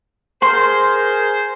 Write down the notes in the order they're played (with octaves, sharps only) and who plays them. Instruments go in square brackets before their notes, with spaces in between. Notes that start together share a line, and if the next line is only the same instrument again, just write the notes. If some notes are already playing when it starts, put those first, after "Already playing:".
[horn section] G#4 A#4 C5 [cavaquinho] C6